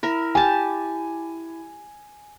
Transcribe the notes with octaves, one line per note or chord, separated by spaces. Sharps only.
E4 A#4 E5
G4 G#5 A5